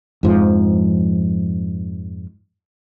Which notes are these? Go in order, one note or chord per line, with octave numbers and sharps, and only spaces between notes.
F2 G#2 F3